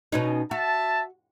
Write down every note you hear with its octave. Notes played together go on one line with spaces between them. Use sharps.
B2 C#4 D#4
F#4 E5 A5